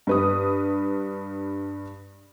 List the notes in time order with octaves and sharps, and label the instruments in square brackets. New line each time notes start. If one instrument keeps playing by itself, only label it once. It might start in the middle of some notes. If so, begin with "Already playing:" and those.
[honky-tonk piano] G2 B4 D#6